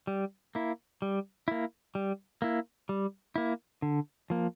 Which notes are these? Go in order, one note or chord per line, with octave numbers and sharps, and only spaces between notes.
G3
A#3 E4
G3
A#3 E4
G3
A#3 E4
G3
A#3 E4
D3
F3 A#3